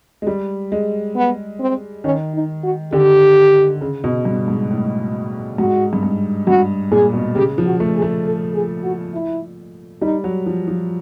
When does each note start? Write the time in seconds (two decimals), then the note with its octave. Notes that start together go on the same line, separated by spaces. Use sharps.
0.22 G#3
0.27 G3
0.72 G#3
1.16 B3
1.60 C4
2.04 D#3 C#4
2.34 D#4
2.63 F#4
2.93 D3 G4
3.81 C#3
4.04 B2
4.25 G2
4.48 G#2
4.71 A2
5.58 G#2 F#4
5.93 G2
6.03 G#2
6.47 G2 F#4
6.91 A#2 G#4
7.13 B2
7.35 C#3 G4
7.58 F3
7.65 F#4
7.80 A3
7.95 G#4
8.02 A3
8.25 A4
8.53 G#4
8.83 F#4
9.13 E4
10.01 G3 D#4
10.24 F#3
10.46 F3
10.68 F3